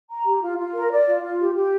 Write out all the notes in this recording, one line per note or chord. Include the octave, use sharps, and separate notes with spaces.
A#5
G4
F4
F4
A#4
D5
F4
F4
G4
G4